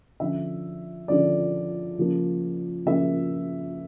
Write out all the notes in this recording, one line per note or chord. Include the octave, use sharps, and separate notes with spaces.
D3 F3 C#4 E5
D3 F3 C#4 D5
C#3 F3 A#3
C#3 F3 A#3 E5